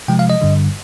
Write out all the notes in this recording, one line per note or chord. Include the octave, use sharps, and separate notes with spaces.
C3 F3 G#3 G5
F5
D#5
G2 D3 G3